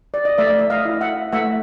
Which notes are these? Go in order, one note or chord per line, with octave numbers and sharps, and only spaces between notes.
D5
D#5
A3 D5 E5
E5
D#5 F5
E4
E5 F#5
A3 E5 F#5